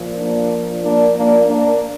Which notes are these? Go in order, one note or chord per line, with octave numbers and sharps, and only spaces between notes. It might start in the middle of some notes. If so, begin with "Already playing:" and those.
Already playing: A#2 F3
A#3 D4
A#3 D4
A#3 D4
A#3 D4